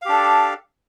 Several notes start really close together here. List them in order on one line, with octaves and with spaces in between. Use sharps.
F5 G4 D4 A4